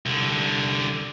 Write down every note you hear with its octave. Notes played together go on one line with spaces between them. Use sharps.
C2 D3